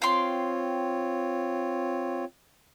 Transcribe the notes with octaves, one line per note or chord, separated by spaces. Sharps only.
C4 F4 C#5 F5 G5 C6